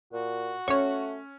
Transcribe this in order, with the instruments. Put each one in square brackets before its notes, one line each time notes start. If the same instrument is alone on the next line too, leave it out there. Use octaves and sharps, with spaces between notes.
[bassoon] A#2 [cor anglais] F#4
[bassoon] A3 [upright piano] C#4 [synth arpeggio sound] C#5 C#6